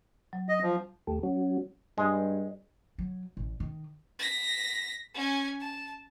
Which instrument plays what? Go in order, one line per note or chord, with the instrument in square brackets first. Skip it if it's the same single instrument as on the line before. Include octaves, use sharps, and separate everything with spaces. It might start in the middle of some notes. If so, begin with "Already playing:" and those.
[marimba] F#3
[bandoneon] D#5
F3
[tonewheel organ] D#2 A3 G4 A4
F#3 C#4 F#4
[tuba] G2 [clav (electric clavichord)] G#3
[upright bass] F#3
A1
D#3
[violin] A#6 B6
C#4 G#5
A5